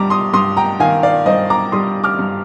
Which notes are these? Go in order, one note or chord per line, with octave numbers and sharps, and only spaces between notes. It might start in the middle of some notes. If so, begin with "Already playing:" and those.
Already playing: G2 G3 A#5 D6
C6 D#6
G2 C6 D#6
G5 A#5
D#3 F5 G#5
D5 F5
G2 C5 D#5
A#5 D6
G3 C6 D#6
D6 F6
G2